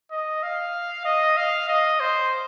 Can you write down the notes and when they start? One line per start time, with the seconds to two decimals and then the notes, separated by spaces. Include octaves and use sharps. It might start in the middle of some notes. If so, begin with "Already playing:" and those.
0.11 D#5
0.43 F5
1.05 D#5
1.37 F5
1.69 D#5
2.00 C5